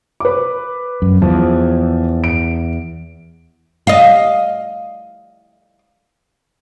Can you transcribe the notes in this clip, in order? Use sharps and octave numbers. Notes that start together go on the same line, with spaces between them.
B4 D6
F#2
E2 F3
D7
D#5 F5